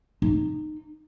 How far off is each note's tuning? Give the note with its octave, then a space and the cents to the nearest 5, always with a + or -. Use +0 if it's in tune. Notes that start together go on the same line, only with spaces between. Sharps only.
D#4 -20